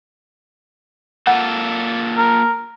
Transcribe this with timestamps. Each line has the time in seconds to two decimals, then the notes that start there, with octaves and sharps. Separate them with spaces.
1.27 A#3 F4 A4 F#5
2.17 A#4